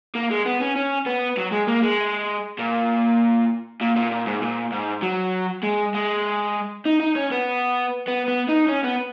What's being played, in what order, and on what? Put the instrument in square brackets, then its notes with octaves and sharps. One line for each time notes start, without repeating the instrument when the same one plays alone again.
[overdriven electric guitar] A#3
G#3
B3
C#4
C#4
B3
F#3
G#3
A#3
G#3
A#2
A#2
A#2
A#2
G#2
A#2
G#2
F#3
G#3
G#3
D#4
D#4
C#4
B3
B3
B3
D#4
C#4
B3